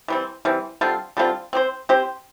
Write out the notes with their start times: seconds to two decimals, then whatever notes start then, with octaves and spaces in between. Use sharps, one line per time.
0.08 E3 G3 C4
0.45 E3 G3 C4
0.81 D3 G3 C4 F4
1.17 D3 G3 C4 F4
1.53 C4 G4 C5
1.89 C4 G4 C5